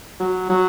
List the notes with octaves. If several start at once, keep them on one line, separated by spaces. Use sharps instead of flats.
F#3
F#3